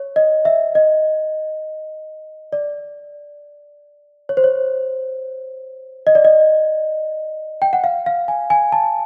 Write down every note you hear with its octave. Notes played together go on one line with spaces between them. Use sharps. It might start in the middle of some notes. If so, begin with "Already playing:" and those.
Already playing: C#5
D#5
E5
D#5
D5
C#5
C5
C#5
D#5
D5
D#5
G5
F#5
F5
F5
G#5
G#5
A5